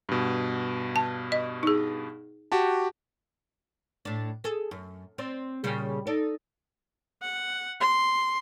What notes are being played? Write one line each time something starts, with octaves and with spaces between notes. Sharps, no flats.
G2 B2
A5
D#5
D#4 G#4
F#4 G4 A5
A2 D4
G#4 A4
F#2
C4 D5
A#2 C#3 G3
D#4 A4 D5
F#5
C6